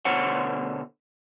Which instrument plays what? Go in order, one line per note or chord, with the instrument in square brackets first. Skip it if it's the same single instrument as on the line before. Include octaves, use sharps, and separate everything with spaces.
[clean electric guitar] D2 B2 D3 C5 C#5 F#5